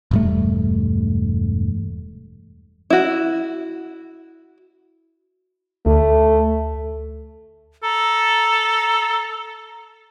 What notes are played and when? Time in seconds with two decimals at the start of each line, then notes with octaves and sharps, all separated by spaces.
0.11 E1 G2 A3
2.90 E4 F#4
5.86 D2 A3
7.83 A4 A#5